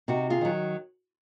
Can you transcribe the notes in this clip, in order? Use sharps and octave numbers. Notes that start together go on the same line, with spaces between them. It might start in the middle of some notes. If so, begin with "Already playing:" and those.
C3 D#4 F#4
F4 G#4
D#3 F#3